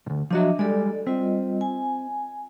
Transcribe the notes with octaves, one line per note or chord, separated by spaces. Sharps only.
D2 G#2
F3 F#3 D4 F#4 D#5 E5
G3 G#3 A4 D5
G3 C4 F4 D#5
G#5